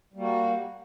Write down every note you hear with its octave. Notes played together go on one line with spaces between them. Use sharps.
G3 A#3 F#4